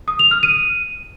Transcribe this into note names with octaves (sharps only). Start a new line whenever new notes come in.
D#6
F7
F6
D#7